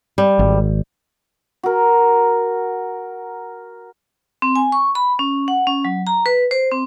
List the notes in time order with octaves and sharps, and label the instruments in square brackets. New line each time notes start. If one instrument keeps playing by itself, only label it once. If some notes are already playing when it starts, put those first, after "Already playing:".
[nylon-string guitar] G3
[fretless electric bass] G#1
[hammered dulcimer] F#4 A#4
[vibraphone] C4
G#5
C#6
B5
C#4
F#5
C#4
F#3
A#5
B4
C5
C4